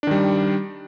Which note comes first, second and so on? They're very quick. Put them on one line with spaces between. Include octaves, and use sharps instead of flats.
D4 D#3 G3